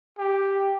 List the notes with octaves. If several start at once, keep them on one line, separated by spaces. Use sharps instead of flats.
G4